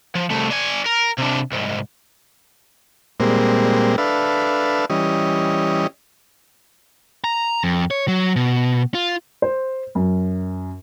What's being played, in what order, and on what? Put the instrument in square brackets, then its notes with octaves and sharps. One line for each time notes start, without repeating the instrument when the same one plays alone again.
[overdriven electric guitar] F3
C2 A3
D4 G#5
A#4
C3 D4
C2 G#2
[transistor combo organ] A#2 G3 G#3 A#3 C4
D4 A4 B4 E5 F5
E3 G3 C#4 D#5
[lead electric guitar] A#5
F2
C#5
F#3
B2
F4
[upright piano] C5
F#2